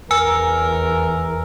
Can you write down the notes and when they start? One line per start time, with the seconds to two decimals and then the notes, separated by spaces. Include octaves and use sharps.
0.11 E2 A#4 G#5 E6